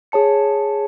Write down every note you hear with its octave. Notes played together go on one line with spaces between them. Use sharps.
G#4 C#5 A5 C#7